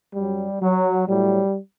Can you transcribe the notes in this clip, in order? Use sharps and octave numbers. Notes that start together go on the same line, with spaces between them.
F#2 F#3 G3
F#3
A2 F#3 G3